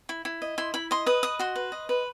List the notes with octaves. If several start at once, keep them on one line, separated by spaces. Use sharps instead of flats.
E4
E4
D#5
E4 C6
E4 B5
D#5 C6
B4 D#6
D#5 D#6
F#4 C6
B4
D#5
B4